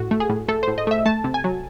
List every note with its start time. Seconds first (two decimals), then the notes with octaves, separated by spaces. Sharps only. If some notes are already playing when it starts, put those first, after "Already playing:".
Already playing: A2 F#4
0.11 A3
0.20 G#4
0.29 A2
0.48 A3 A4
0.63 A2 C5
0.78 D#5
0.87 A3 E5
1.06 A3 A5
1.24 C3
1.34 G#5
1.44 F#3